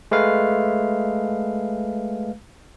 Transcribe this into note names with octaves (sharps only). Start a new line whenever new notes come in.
G#3 A3 B4 F5